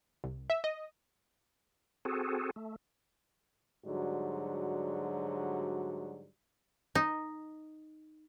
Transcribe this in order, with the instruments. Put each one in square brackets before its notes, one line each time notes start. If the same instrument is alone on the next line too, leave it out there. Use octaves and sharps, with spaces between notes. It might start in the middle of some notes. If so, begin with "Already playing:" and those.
[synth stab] C2
E5
D#5
[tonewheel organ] C4 F#4 G#4 A4
A3
[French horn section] G#2 D3 F#3 G3 F#4
[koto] D#4